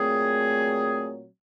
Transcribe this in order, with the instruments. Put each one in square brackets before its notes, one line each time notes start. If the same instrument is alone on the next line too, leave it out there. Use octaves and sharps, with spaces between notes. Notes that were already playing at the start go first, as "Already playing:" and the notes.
Already playing: [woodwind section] A#2 F#3 A3 C4 G#4